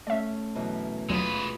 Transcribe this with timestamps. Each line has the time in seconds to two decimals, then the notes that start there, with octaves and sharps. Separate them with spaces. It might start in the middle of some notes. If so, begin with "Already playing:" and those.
0.07 A3 C#4 D5 E5
0.55 F#2 B2 E3
1.09 D#2 F#3 G#3 F4 B4